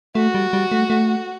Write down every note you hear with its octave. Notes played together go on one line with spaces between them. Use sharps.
A3 F#4
G3
G3
A3
A3